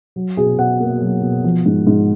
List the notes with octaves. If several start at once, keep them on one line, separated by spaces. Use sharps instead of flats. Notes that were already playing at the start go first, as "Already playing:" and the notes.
F#3
B2 G#4
B2 F#5
A#3
F#3
B2
F3
G#2
G#2